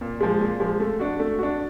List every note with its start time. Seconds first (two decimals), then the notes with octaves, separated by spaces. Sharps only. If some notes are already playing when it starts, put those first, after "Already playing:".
0.01 A#2
0.21 F3 G#3
0.41 A#2
0.60 F3 G#3
0.80 A3
0.99 D4 F#4
1.19 A3
1.39 D4 F#4